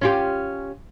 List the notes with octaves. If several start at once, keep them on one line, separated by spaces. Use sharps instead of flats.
C#4 F4 G4